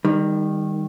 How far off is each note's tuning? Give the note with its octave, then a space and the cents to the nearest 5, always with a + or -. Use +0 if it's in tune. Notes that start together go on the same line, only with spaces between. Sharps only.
D#3 +0 G3 +30